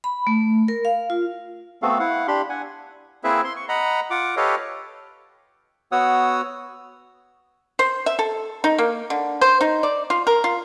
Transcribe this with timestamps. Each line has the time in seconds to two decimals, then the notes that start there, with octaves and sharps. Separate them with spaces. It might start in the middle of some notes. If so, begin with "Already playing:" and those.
0.04 B5
0.27 A3
0.68 A#4
0.85 F5
1.10 F4
1.82 A3 B3 C4 F#4 A4 F5
1.99 E4 F5 F#5
2.28 D4 G4 B5 C6
2.49 F#5 G#5
3.24 A#3 C4 E4 G#4 B4 E5
3.44 C6
3.56 C#6
3.69 D#5 F#5 A#5 B5
4.10 F4 F#5 D6
4.37 G4 A4 B4 C#5 D#5 F5
5.92 B3 F#4 C#5 F#5 D#6 E6
7.79 C5
8.06 E5
8.19 A4
8.64 D#4
8.78 A#3
9.10 D3
9.41 C5
9.61 D#4
9.83 D5
10.10 F4
10.27 A#4
10.44 F4